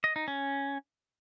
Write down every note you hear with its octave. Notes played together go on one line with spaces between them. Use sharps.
D#5
D#4
C#4